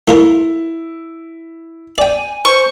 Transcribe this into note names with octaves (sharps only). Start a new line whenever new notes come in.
A3 E4 F4 A#4
D5 G5 G#5
C5 C#6